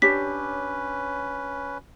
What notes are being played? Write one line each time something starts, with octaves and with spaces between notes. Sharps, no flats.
C#4 D4 G4 B4 C#5 B6